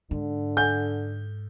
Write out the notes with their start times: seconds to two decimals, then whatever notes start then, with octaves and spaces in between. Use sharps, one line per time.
0.11 G#2 D3
0.57 A4 F#5 G#5 G6